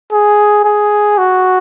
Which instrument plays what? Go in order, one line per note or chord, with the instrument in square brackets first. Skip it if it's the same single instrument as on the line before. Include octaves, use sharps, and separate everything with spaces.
[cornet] G#4
G#4
F#4